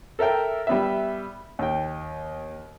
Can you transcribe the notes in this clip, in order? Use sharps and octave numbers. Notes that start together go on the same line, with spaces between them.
A4 A#4 E5 G5
G3 B3 E5
D#2 G5